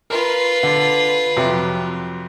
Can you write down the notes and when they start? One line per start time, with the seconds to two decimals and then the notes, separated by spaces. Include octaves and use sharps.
0.10 F4 A#4 B4
0.63 D3
1.37 F2 C3 F#3